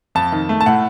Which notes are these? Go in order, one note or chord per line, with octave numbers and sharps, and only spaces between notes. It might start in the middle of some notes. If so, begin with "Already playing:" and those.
F2 A5
D#3
A3
A5
A2 F#5